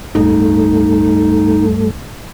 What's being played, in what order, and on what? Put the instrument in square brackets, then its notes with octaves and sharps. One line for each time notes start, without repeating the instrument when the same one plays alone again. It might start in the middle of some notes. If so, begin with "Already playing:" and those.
[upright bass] D1 C#2 [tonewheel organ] G2 A3 [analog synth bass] D#4